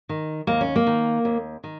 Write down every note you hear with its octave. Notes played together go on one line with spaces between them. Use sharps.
D#3
D#2 A#3
C#4
A#3
D#3
D#2
D#3